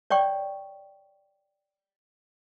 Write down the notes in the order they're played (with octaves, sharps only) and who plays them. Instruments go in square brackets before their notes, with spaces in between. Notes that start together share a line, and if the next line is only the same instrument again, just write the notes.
[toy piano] C#5 D5 G5 C#6